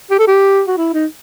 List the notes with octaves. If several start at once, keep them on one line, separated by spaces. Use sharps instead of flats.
G4
A4
G4
F#4
E4
D#4